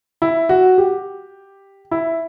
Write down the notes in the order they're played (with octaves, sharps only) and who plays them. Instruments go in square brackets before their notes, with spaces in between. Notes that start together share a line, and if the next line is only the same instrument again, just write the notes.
[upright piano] E4
F#4
G4
E4